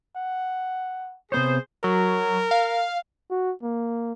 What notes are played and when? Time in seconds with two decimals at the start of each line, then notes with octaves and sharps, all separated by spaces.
0.16 F#5
1.32 C3 B3 G#4 C5 C#5
1.84 F#3 A#4
2.51 F5
3.30 F#4
3.63 A#3